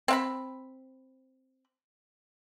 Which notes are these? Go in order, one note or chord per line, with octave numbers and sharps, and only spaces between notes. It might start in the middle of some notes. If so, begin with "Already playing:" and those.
C4 F5 B5